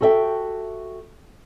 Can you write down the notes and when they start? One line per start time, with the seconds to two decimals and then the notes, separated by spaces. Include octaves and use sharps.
0.01 F#4 G4 A4 C5 E5 G5